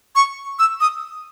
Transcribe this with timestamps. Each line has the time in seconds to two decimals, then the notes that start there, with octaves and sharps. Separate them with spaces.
0.16 C#6
0.59 E6
0.81 D#6